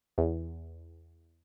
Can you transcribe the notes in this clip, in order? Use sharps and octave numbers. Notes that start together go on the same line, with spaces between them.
E2